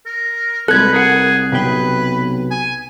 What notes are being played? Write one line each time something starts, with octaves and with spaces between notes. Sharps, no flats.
A#4
C2 G#3 A4 B4 F#6 G#6
G#4 A#4 F#5
B1 C3 B4 G5
G#5